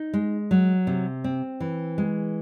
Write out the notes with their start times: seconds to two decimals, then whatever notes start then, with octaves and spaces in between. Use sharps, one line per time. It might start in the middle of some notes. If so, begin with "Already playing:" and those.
Already playing: D#4
0.13 G#3
0.51 F#3
0.87 C3
1.24 C4
1.60 E3
1.98 G#3